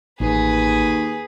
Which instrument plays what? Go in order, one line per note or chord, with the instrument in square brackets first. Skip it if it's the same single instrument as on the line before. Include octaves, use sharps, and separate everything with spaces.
[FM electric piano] A1 [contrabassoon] D#2 [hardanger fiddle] G#4 B4